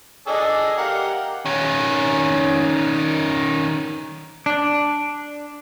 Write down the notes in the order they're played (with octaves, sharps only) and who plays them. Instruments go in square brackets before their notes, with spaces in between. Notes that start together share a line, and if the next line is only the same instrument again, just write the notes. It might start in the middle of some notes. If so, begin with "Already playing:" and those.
[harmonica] D4 G#4 A4 [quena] D#5
[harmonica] G4 A#4 F#5 [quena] F5
[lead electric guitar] D#3 C#4
[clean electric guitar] D4